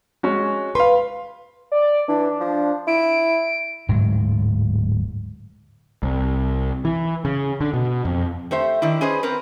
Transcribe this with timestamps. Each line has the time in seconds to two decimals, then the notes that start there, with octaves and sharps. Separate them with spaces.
0.23 G#3 C#4 F#4
0.75 B4 F5 C6
1.72 D5
2.08 E3 D4
2.40 F3
2.88 E4 D7
3.89 D1 G#2 F#3
6.03 C2
6.85 E3
7.25 C#3
7.61 D3
7.74 B2
8.05 F2
8.51 A3 G4 C5 E5
8.82 D#3 D4 E4
9.01 C#4 G#4 B4 C5 D#5
9.23 C4 A#4 B4